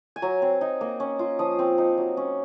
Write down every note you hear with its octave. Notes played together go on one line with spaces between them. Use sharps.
G#5
F#3 A#5
C4
D#4
A#3
C#4
F4
F3 D#6
C4
D#4
F#3
C#4